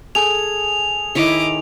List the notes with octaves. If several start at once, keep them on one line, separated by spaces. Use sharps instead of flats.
G#4 A4 G#5 F7
D#3 E4 C#5 D#5 D6